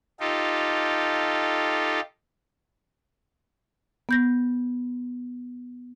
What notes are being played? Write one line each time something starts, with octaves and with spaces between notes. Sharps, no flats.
D#4 F4 G4 A4
B3 G6 A#6